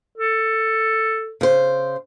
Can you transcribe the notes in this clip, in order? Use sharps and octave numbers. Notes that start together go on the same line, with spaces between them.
A4
C#3 C5